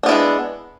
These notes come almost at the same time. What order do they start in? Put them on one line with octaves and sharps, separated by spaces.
D4 B3 E4 G#3